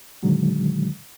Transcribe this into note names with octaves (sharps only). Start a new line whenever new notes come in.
A#2 D3 D#3 F#3 G#3